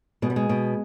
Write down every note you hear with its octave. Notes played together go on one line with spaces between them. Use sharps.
B2 G#3
G3
G#3
B2